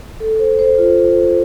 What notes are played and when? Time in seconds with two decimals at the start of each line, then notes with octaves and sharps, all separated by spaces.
0.20 A4
0.39 C5
0.59 C5
0.78 F4